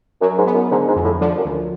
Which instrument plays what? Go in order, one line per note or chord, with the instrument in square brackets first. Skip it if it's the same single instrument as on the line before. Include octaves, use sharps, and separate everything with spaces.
[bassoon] F#2 [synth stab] F#3
[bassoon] G#2
[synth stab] B3
[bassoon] F#2
[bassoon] G#2 [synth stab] D3
[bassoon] G#2
[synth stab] F2
[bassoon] A2
[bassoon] D3 [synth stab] F3
[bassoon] F#2
[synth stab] D2